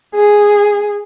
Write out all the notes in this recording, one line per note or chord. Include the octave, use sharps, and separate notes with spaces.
G#4